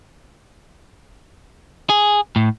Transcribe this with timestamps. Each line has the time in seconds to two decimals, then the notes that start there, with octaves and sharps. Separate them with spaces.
1.90 G#4
2.36 A2